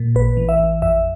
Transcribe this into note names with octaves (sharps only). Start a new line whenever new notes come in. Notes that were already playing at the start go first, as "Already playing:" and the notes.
Already playing: A#2
A1 B4
E3
E5
A1
F2 E5